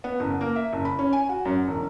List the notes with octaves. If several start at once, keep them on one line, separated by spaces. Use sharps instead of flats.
B3
F#1
A#3
E5
F#1
B5
C#4
G#5
F#4
F#2
E1